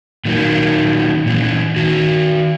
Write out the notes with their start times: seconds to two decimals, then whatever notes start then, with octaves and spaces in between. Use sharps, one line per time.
0.25 A#2 D#3 F#3 A3 A#3
1.26 A#2 D#3 E3
1.76 D#3 F#4